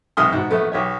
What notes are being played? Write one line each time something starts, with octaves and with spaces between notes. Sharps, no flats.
B1 C3 G#3 C6 D#6 F6
G#2 B2 F#4
A#1 A3 B3
B1 G4 C#5